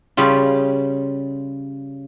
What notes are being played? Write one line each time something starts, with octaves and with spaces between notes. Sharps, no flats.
C#3 G3 F4